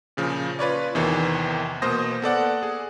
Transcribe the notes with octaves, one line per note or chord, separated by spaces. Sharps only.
A#2 C#3 F3
F4 B4 C#5 D5
E2 C3 D#3 E3
B2 A#3 C5 D#6 A#6
B3 A4 D5 F#5
G#4